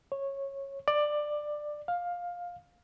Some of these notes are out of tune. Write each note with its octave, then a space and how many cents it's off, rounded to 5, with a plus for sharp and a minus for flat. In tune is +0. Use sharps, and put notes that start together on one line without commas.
C#5 -15
D5 +15
F5 +15